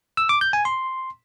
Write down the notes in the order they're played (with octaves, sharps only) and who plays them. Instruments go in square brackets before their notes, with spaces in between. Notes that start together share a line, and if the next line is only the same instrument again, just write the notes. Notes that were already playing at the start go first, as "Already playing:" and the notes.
[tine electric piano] E6
D6
G6
G#5
C6